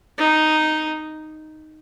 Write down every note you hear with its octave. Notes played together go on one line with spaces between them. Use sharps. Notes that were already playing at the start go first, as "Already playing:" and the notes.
D#4